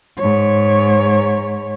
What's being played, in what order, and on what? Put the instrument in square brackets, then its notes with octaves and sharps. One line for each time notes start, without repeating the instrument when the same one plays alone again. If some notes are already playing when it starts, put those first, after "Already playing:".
[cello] G#2 C#5